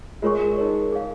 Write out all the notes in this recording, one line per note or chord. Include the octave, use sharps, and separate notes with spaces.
G#3 F4 A#4 C#5 G#5 C#6
D#4 A#4 C#5
G#4 C#5 F5